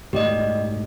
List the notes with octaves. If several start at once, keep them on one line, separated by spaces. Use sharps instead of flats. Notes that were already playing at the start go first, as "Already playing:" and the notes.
G#2 B2 A3 G4 D5 D#5